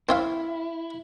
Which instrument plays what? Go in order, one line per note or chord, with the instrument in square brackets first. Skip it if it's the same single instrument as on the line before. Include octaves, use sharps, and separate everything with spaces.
[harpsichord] C4 C#5 F5 [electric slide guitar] E4